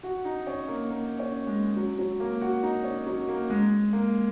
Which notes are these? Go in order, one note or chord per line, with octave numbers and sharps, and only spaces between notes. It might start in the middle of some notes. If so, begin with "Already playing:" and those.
F#4
D#4
C#4
A#3
A#3
C#4
G#3
F#3
F#3
A#3
F#4
D#4
C#4
F#3
A#3
G#3
A#3